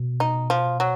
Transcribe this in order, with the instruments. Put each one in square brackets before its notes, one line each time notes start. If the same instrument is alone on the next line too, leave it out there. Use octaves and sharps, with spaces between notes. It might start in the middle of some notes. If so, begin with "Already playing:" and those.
Already playing: [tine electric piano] B2
[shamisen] D#4
F3
F#3